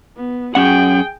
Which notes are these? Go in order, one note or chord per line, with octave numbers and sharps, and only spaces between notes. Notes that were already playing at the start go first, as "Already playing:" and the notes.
B3
F#2 C#4 G#4 F#5 G5